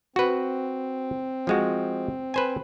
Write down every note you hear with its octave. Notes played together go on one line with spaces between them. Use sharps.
C4 F#4 B4
F3 G#3 F#4
B4 C5 G#5